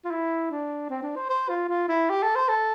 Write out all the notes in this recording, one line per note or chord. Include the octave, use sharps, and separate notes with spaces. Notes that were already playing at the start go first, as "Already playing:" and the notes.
F4
E4
D4
C4
D4
C5
C5
F4
F4
E4
G4
A4
C5
A4